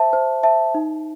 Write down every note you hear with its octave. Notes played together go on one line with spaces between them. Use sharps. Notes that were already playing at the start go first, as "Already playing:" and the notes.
Already playing: C5 E5 A5
C5
E5 A5
D#4